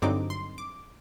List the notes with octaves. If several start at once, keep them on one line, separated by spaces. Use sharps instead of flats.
G2 D3 F#3 C4 D#4 D6
C6
D6